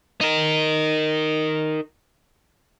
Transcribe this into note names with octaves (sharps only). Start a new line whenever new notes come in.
D#4 A#4